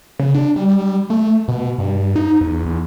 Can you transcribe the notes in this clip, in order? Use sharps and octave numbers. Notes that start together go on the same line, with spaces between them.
C#3
D4
G3
A3
B2
G2
D#4
E2
E2